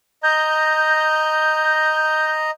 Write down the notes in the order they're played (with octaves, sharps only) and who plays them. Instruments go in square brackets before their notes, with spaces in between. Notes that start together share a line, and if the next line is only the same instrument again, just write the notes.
[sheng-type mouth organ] D#5 A#5 [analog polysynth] G6